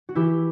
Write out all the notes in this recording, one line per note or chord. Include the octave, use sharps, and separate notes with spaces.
F#4
E3 E4 G4